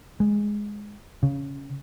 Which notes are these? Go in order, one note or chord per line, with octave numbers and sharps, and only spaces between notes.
G#3
C#3